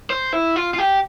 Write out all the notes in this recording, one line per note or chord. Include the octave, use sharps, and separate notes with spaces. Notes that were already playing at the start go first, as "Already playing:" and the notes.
C5
E4
F4
F4
G4